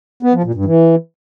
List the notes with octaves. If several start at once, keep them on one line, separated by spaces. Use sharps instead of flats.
B3
F3
A#2
G2
E3